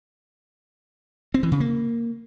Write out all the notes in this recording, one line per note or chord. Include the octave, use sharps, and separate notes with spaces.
C4
E3
C#3
A#3